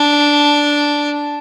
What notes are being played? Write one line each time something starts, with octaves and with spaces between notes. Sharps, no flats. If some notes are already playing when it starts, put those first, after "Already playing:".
Already playing: D4